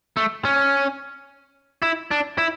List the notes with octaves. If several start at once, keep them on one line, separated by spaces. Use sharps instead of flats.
A3
C#4
E4
D4
E4